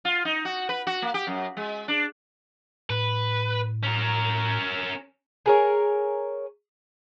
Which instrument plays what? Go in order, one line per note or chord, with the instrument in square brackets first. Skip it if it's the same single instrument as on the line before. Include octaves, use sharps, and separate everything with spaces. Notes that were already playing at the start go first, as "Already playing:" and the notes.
[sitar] F4
D#4
F#4
B4
F#4
A#3
G4
F#2
G#3
D4
[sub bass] A2 [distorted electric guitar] B4
[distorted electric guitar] C#4 A#4
[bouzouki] G#4 A#4 C#5